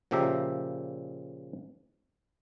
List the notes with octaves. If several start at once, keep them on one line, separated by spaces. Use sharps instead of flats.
A#2 C#3 F3 G4 E5 A#5